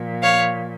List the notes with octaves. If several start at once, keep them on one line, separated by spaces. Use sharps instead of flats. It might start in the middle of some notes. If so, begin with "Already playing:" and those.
Already playing: A#2 F3
C#5 F5